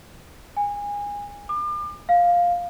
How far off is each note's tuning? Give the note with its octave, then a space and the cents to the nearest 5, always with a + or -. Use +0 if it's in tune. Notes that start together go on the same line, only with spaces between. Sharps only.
G#5 -25
D6 +40
F5 +5